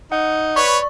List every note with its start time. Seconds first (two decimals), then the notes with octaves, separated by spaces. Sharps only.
0.12 D#4 F#5
0.56 B4 C#5 D5 C#6